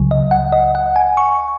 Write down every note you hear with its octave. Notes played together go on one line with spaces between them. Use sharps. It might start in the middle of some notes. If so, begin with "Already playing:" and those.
Already playing: C#2 C#3 F#3
D#5
F#5
D#5
F#5
G#5
C#6